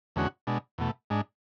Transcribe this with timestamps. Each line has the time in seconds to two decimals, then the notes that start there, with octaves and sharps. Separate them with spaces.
0.16 E2 D3 G#3 C#4 F#4
0.47 B2 G#3 D4
0.78 E2 B2 A3
1.10 G#2 G#3 D4